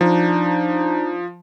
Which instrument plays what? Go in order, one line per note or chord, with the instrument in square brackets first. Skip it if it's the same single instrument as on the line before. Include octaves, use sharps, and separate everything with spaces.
[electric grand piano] F3 [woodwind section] D4 D#4